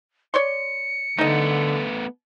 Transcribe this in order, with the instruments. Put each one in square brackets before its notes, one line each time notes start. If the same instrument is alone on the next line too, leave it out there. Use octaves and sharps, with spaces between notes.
[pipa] C#5 D5 C6 [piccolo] C#7
[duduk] D3 [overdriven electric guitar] A3 B3 [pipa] D#4 D#5